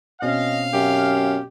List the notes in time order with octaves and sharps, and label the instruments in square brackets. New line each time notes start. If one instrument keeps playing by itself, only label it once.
[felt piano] B2 C4 C#4 [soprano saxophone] D#5 [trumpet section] F5
[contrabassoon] F#2 [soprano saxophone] G4